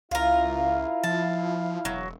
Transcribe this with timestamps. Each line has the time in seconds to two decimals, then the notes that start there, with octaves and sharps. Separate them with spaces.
0.11 C#2 E4 F4 A#4 F5
1.04 F3 A5
1.85 E1 F#3